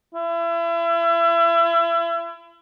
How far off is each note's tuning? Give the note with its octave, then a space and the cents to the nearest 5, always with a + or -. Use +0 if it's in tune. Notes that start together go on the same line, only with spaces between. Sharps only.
E4 +35